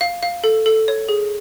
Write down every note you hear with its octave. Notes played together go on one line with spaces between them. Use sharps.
F5
F5
A4
A4
C#5
G#4